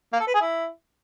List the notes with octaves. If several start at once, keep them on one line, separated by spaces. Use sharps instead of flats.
A#3
A4
B4
G#4
E4